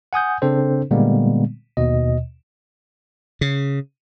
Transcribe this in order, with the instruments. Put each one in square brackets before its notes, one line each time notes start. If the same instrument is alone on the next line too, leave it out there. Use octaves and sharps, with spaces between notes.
[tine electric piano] F#5 G#5 D#6 G6
C#3 C4 D4 A4 C5
A#2 D3 G3 G#3 A#3 B3
D#2 B2 D#5
[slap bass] C#3